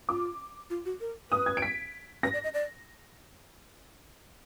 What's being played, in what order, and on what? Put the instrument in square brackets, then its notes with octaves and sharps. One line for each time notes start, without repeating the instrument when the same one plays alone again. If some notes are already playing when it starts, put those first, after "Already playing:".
[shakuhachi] F4 [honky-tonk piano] D6
[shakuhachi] F4
F#4
A#4
[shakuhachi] B4 [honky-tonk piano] D#6
[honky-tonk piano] G#6
D7
B6
[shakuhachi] B4 [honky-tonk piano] A#6
[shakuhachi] D5
D#5
D5